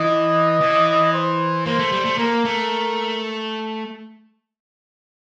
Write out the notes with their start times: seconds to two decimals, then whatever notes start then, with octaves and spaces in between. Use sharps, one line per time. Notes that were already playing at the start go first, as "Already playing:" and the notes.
Already playing: E3 D#5
0.61 E3
1.13 C5
1.66 A#3 C5
1.79 A3
1.92 G3
2.05 A3
2.18 A#3 A#4
2.45 A3